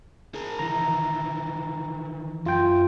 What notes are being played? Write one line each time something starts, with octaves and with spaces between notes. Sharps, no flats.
G#4 A#4
D#3 E3 A#5
F#2 F4 G5